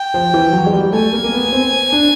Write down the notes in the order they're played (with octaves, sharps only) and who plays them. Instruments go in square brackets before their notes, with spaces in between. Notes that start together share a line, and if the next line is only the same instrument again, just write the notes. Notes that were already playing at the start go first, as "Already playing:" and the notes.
Already playing: [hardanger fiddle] G5
[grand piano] F3
E3
F#3
G#3
G3
[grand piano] A3 [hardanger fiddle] G#5
[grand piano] A#3
A#3
B3
C4
D4